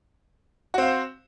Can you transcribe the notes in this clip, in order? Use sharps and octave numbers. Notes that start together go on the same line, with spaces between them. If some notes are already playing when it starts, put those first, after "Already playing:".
C4 F#4 C5 F5